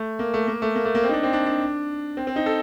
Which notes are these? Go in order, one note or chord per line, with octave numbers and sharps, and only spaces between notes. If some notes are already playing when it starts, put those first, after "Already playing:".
Already playing: A3
A#3
A3
A#3
A3
A#3
A3
A#3
C4
D#4
D4
C4
D4
D4
C4
C4
D#4
A4